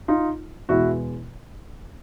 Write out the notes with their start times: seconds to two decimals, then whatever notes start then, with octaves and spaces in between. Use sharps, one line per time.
0.08 D#4 F4
0.69 E2 B2 G#3 E4 F#4